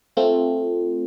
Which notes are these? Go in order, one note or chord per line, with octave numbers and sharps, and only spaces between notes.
A3 C4 F4